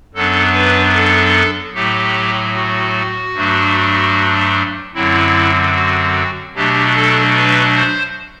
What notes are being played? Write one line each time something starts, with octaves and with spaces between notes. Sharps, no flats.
F#2 F#3 B3 D4 A4
B4
A4
A2 F#3 A3 G4
F#4
G2 F#3 A3 D4
F#2 D3 F#3 C4 E4
F#4
B2 F#3 A3 D4 G4
A4
B4
C5